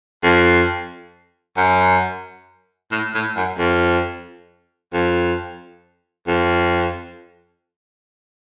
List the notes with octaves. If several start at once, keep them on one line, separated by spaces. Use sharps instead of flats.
F2
F#2
A2
A2
F#2
F2
F2
F2